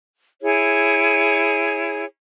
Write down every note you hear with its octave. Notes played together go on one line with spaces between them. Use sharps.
E4 G#4 C#5